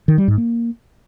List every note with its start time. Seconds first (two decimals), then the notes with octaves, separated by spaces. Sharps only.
0.08 D#3
0.18 G3
0.28 G#2
0.38 A#3